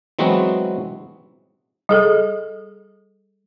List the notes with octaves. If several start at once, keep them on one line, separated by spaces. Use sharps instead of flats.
E3 F#3 G#3 B3 C4 F#4
G3 G#4 A4